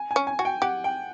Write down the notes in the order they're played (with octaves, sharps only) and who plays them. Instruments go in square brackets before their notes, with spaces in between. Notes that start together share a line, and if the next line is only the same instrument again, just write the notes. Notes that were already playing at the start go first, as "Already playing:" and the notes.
Already playing: [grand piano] G#5
G#5
[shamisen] C#4
[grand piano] G#5
[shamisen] F#4 [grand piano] G#5
[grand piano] G5
[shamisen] G4 [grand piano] F#5
[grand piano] G5